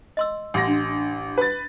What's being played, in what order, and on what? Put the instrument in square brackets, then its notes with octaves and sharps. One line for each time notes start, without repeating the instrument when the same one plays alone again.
[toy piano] D#5 C6 E6
[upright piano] A1 A#6 [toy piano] G4 C6
[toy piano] D4
[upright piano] B4 A6